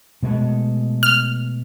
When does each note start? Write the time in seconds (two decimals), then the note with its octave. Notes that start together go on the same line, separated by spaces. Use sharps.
0.22 B2 G#3 A3
1.03 F6